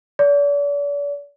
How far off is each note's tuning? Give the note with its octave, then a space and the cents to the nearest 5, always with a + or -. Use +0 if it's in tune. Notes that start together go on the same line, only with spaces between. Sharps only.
D5 -40